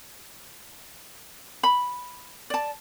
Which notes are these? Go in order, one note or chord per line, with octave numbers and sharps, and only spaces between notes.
B5
D5 A5